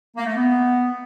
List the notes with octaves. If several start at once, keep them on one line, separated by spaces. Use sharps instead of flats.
A#3
A3
B3